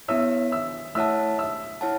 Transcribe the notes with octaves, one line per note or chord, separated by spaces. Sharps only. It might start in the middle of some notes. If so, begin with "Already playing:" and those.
B3 E4 C#5 E5 E6
E5 E6
A3 E4 C#5 E5 F#5 A5 E6
E5 E6
E4 C#5 F#5 A5